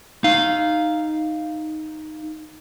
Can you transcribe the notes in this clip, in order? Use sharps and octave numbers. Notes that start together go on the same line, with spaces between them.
D#4 F5